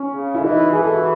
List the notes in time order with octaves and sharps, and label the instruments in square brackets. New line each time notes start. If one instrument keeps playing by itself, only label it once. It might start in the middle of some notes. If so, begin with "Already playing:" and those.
Already playing: [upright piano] C#4
[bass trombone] C#3
[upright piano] E4
[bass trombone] E3 [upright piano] D#4
[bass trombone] E3 [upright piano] G#4
[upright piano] A4
F#4